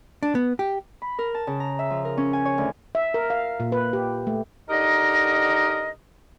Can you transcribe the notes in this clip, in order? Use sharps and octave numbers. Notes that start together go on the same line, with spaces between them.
D4
B3
G4
B5
A#4
A5
C#3
A#5
E5
F3
A#4
C#4
G#5
C#5
D2
E5
A#4
F5
A#2
B4
G4
A3
D3 D#4 G4 A#4 D#5